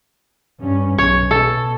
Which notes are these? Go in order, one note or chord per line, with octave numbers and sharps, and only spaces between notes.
G2 C#4
B1 C#5
B2 A4